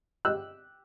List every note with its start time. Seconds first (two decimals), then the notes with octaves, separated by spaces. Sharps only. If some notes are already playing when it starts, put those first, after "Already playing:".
0.25 G4 E6 F#6